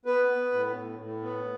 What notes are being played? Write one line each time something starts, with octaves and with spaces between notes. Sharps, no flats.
B3 B4
B3
A2
A2
A2
B3